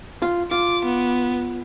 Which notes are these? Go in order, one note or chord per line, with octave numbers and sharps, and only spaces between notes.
F4
F4 D6
B3